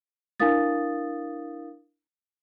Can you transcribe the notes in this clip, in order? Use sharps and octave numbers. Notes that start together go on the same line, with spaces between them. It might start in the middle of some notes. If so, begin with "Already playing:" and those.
D4 E4 A#4 F5 D#6 A6